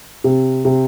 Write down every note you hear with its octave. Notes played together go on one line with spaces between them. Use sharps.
C3
C3